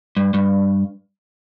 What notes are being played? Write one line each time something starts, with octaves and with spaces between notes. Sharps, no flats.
G2
G2